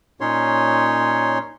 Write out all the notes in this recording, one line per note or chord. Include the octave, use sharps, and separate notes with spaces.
A#2 C#4 D#4 C#5 C6